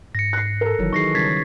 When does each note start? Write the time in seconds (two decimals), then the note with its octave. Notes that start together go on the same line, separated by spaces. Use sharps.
0.15 G#2 A#6 C#7
0.33 F#6 C7
0.61 A4 A#4
0.79 F#1 D#3 E3 F#3
0.93 D#3 D#4 G#4 C#6 A#6 C7
1.15 C#3 G3 C#4 G#6 A6 B6